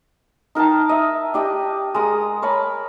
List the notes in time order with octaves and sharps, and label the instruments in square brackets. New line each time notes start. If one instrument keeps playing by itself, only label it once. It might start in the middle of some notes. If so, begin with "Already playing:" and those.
[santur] D#4 A#4 G5 A5
D#5 E5
D4 G4 D#5
G#3 A#4 D#6
A#4 C#5 A5 B5